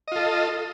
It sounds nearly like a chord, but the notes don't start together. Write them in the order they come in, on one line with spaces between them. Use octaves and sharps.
D#5 F4 A4